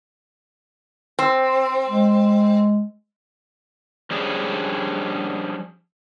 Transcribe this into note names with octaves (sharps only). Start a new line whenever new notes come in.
C4
G#3
F3 G3 C#4 D4 G#4